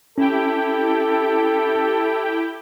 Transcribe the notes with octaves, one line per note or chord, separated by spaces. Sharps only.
C#4 E4 G4 A4 G5